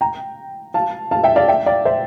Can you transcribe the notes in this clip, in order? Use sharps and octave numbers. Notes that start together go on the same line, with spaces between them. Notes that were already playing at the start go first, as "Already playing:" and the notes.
G5 A#5
F5 A5
F5 A5
E5 G5
D5 F5
E5 G5
D5 F5
C5 E5